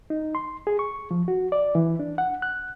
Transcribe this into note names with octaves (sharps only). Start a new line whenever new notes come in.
D#4
C6
G#4
C#6
F3
F#4
D5
E3
D4
F#5
F#6